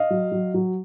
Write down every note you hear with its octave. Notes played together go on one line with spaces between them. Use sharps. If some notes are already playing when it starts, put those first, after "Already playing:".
Already playing: D#5 F5
F#3
F#3
F#3